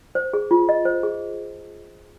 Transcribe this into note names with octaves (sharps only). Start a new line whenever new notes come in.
C5
G#4
F4
D#5
C5
G#4